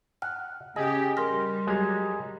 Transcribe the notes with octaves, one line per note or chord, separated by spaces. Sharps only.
F#5 F6
C#3 G4 G#4 D#5
G3 A#4 C6 F6 A#6
F#3 G#3 G4 A#5 G#6